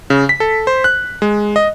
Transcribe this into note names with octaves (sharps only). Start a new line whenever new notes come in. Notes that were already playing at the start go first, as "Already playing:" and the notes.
C#3
B6
A4
C5
F#6
G#3
D#5